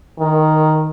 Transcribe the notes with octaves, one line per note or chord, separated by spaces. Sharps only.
D#3